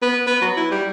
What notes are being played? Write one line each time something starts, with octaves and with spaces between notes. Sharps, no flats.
B3
B3
F#3
E4
G3